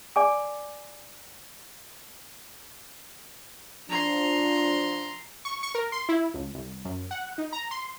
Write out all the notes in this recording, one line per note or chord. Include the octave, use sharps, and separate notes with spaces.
D5 G#5 D6
F3 D4 A#5 C6
C#6
C#6
A#4
C6
E4
C#2
C2
F#2
F#5
D#4
A#5
C6